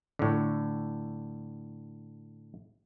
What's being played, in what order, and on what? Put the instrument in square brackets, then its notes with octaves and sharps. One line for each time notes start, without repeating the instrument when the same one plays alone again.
[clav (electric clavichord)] A2 D3